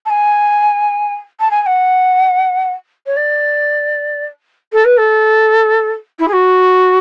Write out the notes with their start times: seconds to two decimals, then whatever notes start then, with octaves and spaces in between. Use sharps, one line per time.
0.06 A5
0.10 G#5
1.40 A5
1.51 G#5
1.62 G#5
1.66 F#5
3.06 C#5
3.16 D5
4.73 A4
4.85 B4
4.98 A4
6.19 E4
6.28 G#4
6.33 F#4